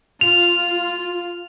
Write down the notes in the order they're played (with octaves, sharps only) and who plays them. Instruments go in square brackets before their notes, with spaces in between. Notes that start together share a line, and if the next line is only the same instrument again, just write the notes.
[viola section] F4 [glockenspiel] F7